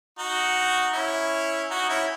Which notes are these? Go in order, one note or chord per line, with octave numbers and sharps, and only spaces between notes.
D#4 F#4
C#4 E4
D#4 F#4
C#4 E4